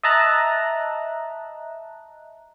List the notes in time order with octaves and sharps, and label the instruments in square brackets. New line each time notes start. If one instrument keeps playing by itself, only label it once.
[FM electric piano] D#5 E5 A5 A#5 F#6